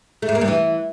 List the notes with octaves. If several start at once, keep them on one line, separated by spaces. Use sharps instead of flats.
A3
G#2
A#3
G2
E3